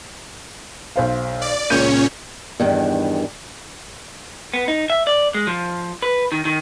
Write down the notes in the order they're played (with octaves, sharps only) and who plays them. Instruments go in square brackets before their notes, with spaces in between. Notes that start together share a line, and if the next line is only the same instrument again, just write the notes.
[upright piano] B1 C5 F5
[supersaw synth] D5
[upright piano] C#2 G6 D#7 [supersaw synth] A#2 C#4 C#5
[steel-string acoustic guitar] E2 G2 D#3
[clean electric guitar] B3
D#4
E5
D5
G#3
F3
B4
D#3
D#3